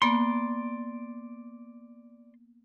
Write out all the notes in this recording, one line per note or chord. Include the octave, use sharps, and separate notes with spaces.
A#3 B3 D5 C6